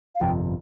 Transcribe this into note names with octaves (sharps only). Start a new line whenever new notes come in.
F5
G1 F2 C3 F3 G5